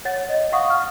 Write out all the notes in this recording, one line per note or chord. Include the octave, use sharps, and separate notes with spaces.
C#5 F#5 A6
D#5
F5 F#5 C#6 D#6
F6